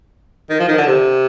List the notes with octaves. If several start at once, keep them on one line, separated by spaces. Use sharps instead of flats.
D#3
F3
D#3
D3
C3